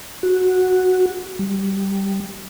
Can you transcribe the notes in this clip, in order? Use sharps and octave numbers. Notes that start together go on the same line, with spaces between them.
F#4
G3